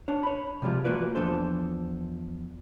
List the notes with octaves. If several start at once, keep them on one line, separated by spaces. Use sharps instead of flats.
D4 C#5
C#5 B5
C3 F3 G3 G#3 F4
E3 A#3 F4 F#4 B4 D5
E2 E3 F3 D4 A4 C5